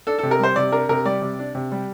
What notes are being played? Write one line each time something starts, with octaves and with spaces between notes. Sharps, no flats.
D4 A4
C3 A4
A#4
G3 C5
C3 D5
D4 A#4
C3 A#4
G3 D5
C3
D4
C3
G3